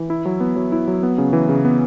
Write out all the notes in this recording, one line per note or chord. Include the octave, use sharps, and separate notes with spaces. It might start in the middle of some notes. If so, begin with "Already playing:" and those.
Already playing: E3
E4
F#3
B3
F#3
E4
F#3
B3
C#3
E3
C#3
B3